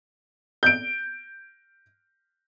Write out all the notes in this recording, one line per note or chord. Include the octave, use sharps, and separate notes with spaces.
G6 D7